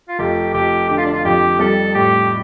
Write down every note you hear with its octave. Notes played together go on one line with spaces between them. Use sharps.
F4
F1 G4
F1 G4
D3 G4
F4
D4
F4
F2 G4
G3 A4
A2 G4